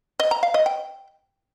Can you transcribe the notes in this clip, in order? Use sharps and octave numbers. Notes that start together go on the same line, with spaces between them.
D#5
A#5
F5
D#5
G5